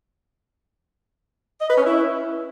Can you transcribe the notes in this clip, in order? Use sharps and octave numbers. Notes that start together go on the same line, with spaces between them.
D#5
B4
C#4
E4